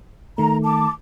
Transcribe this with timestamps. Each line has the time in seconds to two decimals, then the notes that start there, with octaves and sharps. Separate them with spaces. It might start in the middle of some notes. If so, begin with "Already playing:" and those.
0.38 D#3 A3 A#5
0.64 A5 D6